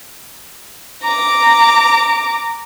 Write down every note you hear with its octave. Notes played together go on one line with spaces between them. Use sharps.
A#5 D6